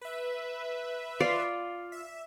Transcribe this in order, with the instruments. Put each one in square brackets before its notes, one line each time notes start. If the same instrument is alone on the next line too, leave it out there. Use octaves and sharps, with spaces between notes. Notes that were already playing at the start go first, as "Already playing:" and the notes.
[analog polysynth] B4 E5
[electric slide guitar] F4 F5 [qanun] D5
[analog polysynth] E5